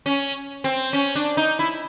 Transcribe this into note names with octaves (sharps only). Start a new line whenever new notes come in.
C#4
C4
C#4
D4
D#4
E4